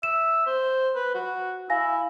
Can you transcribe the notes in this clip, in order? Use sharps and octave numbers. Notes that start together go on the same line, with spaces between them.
E5 E7
C5
B4
F#4
E4 F5 G#5 A#6